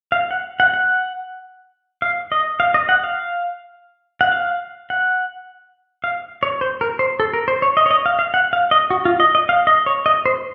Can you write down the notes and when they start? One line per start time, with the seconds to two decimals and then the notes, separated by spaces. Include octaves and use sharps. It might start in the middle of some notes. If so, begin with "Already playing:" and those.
0.12 F5
0.31 F#5
0.60 F#5
0.74 F#5
2.02 F5
2.32 D#5
2.60 F5
2.74 D#5
2.89 F#5
3.04 F5
4.21 F#5
4.32 F5
4.90 F#5
6.04 F5
6.43 C#5
6.61 C5
6.81 A#4
6.99 C5
7.20 A4
7.33 A#4
7.48 C5
7.62 C#5
7.77 D#5
7.86 C#5
7.91 D#5
8.06 F5
8.19 F5
8.34 F#5
8.53 F5
8.71 D#5
8.90 F#4
9.05 F4
9.20 D#5
9.35 D#5
9.49 F5
9.67 D#5
9.86 C#5
10.06 D#5
10.26 C5